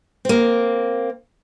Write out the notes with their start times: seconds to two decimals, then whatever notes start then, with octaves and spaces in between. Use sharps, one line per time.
0.25 A#3 C4